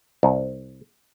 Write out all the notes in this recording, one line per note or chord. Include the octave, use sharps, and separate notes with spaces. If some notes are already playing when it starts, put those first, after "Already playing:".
C2